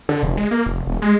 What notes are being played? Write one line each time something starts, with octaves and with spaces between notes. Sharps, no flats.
D3
F1
G#3
A#3
F1
E1
G#3